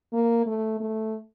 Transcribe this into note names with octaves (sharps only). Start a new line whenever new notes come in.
A#3
A3
A3